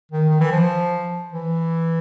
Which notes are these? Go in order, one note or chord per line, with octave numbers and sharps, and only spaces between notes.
D#3
D#3
E3
F3
E3